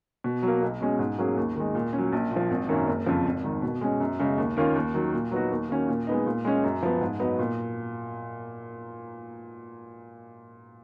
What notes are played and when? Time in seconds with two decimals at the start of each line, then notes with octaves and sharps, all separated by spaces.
0.24 B2
0.43 F#3
0.48 A#3
0.62 B1
0.81 B2 G#3 C#4
0.99 G#2
1.18 F#3 A#3 C#4 G#4
1.37 D#2
1.56 D#3 G#3
1.74 A#2
1.93 C#4
1.98 F#3
2.13 A#1
2.31 A#2 F3
2.50 G#1
2.69 F#2 D#3 A#3 C#4
2.87 F#1
3.06 F2 C#3 F3
3.25 G#1
3.44 G#2 D#3
3.62 B2
3.81 G#3 C#4
4.00 F#2
4.20 C#3 G#3
4.38 D#2
4.57 D#3 A#3 C#4 F4
4.76 D#2
4.94 D#3 F#3
5.13 A#2
5.31 F#3 B3 D#4 F#4
5.51 D#2
5.70 D#3 A#3 C#4 F#4
5.88 A#2
6.07 G#3 B3 D#4
6.26 A#2
6.45 G#3 C#4
6.63 F#2
6.82 F3 B3
7.01 G#2
7.20 F#3 B3 D#4
7.39 A#2